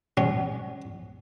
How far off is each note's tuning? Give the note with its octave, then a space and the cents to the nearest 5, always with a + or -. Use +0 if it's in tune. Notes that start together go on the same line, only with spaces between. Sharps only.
F#3 +35 C#4 -10